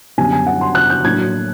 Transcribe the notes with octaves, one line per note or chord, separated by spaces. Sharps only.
F#2 D3 G3 B3 D4 G#5
G#5
F#5
C6
F#6
G6
A2 F#3 A#3 D4 G#6